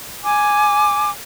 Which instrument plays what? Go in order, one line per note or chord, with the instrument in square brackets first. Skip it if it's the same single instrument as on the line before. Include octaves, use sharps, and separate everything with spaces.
[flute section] G#5 D6